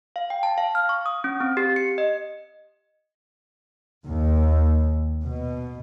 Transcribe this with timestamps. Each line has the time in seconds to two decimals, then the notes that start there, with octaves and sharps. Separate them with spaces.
0.16 F5
0.30 G5
0.43 A5
0.58 F5
0.75 F6
0.89 C#6
1.06 D#6
1.24 C#4
1.41 C4
1.57 G4
1.76 C#7
1.98 D#5
4.05 D#2
5.23 B2